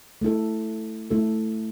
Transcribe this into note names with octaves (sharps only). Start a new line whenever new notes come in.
A3 E4 A4
A3 E4 A4